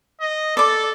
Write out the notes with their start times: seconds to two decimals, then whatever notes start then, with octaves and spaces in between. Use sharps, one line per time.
0.21 D#5
0.57 A4 D5 D6